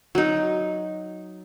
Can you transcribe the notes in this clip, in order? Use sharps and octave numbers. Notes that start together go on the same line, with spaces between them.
F#3 D#4